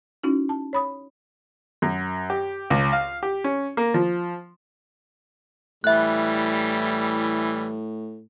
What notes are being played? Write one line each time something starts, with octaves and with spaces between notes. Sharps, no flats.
C#4 D#4 E4 F#4
A5
C#5 B5 D#6
F#2
G4
C#2
F5
G4
C#4
A#3
F3
A2 E3 G3 E5 F#6